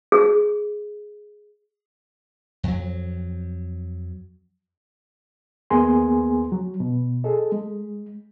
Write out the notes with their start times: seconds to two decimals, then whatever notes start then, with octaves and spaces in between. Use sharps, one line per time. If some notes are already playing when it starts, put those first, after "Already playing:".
0.12 G#4
2.63 F2 F#3
5.70 D#2 A#3 B3 G#4 G#5 C6
6.52 F#3
6.80 B2
7.24 G#4 A4 D#5
7.52 G#3